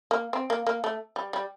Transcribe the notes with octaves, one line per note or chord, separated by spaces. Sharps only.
A#3
C4
A#3
A#3
A3
G3
G3